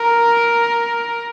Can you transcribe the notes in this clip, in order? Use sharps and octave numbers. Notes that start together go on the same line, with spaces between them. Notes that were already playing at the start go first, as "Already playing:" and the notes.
Already playing: A#4